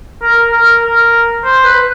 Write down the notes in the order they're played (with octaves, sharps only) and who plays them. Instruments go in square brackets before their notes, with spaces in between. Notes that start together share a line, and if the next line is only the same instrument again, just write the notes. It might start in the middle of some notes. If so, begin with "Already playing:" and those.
[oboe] A#4
A#4
A#4
C5
B4